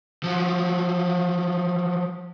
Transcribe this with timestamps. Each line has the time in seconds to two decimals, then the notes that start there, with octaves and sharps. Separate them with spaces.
0.23 F3 F#3